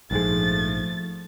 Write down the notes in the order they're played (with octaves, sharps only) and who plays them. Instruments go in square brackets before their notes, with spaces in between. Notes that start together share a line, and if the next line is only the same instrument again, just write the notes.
[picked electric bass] A#1 G#2 G#3 [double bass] F3 A3 [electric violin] A6